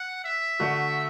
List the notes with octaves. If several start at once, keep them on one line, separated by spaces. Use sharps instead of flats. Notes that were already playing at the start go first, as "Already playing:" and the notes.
Already playing: F#5
E5
D3 A3 F#4